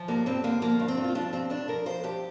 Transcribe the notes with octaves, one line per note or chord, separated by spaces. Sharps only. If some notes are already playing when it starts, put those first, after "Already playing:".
Already playing: F3
G2 A#3
G2 C4
D3 A#3
F3 A#3
G2
C4
G2
F4
F3 D4
G2 C4
G2 D4
F3 A#4
F3 C5
G2 G4